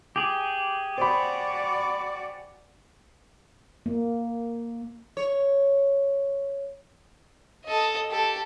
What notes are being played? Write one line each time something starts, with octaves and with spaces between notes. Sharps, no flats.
G4 G#4
F#4 C5 D5 B5
A#3
C#5
A4 D#5
G4 A4